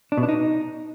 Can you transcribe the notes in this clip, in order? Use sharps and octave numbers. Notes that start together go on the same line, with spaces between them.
D4
B2
D4
D#4